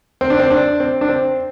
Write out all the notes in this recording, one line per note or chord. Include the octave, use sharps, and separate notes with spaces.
C4
D4
C4
D4
C4
D4
C4